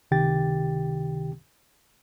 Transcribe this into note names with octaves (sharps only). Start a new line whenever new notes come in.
C#2 C3 D#3 G4 G5 A6